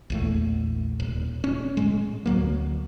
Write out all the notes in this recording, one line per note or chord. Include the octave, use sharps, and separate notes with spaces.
A#1 E2 A3
D#1
C#4
A2 G#3
D2 F#3 A#3